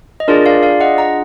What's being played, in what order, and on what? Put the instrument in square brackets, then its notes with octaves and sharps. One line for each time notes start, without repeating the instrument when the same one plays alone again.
[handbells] D#5
D4 F4 G#4 A#4 D5
D5 F5
D5 F5
D#5 F#5
F#5 A#5